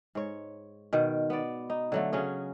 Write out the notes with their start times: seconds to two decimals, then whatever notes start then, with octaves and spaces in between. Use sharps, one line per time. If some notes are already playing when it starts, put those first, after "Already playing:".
0.15 G#2 C#5
0.93 B2 D#3
1.30 B3 D5
1.70 D#4
1.92 D3 F#3 A3
2.12 C#3 F#3 C#4 G#4